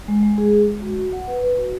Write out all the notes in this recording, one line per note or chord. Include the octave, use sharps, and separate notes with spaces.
G#3
G#3
G#4
G#3
G#3
F#4
F#4
F#5
B4
B4
F#4